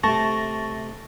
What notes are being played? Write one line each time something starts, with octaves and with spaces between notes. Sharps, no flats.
C3 A3 A5 C#6 A6 A#6